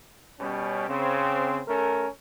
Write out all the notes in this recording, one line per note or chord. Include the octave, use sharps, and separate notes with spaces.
B2 G3 C#4
C#3 C4
A3 C#4 A#4